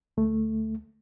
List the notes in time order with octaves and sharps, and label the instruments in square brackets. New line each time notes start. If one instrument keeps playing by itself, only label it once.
[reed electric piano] D2 A3